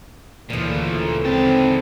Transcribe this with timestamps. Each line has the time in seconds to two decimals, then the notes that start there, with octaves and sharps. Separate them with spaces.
0.50 D2 A#2 C#3 E3 F3 D4 A4
1.24 G#2 C4 A5